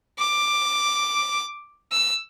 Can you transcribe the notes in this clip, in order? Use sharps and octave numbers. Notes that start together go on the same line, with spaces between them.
D6
E6